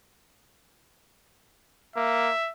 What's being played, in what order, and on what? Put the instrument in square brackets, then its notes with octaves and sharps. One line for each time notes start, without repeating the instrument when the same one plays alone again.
[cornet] A#3 [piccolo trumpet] E5